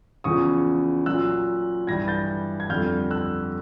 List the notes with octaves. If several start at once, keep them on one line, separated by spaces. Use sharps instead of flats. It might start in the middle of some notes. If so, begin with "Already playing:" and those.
E2 C#3 F3 C#6 D#6
A#2 F#3 E6 F#6
G2 E3 G3 G#6 A#6
G6 A6
G#6
F2 D3 G3 F6 G6
E6 F#6